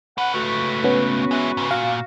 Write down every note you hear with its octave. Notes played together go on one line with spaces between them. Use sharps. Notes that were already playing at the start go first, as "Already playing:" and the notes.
C#4 B4 F#5
C#2 A3 F#4 B4
B3 C#4
G#3 E4
G#2 C#3
A#2 F#4 F5